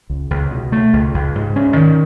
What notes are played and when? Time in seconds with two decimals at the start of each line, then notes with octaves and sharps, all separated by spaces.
0.10 C#2
0.30 C#2
0.51 B2
0.72 A3
0.93 C#2
1.14 C#2
1.35 G#2
1.56 C#4
1.77 D#3